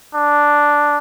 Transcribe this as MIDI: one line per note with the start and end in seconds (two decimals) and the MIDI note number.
0.14 0.98 62